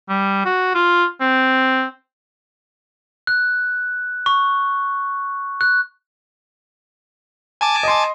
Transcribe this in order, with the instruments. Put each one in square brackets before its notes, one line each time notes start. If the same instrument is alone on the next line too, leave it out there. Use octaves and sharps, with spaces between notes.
[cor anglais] G3
F#4
F4
C4
[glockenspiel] F#6
C#6
F#6
[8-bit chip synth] G#5 A5 D6
[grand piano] D#5 C6